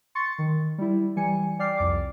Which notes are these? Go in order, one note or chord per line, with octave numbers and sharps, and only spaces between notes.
C6 C#6 A6 C#7
D#3
G3 E4
E3 G3 G#5 C#7
D5 G5 D6 F6 C7
C2 F2 D5 D6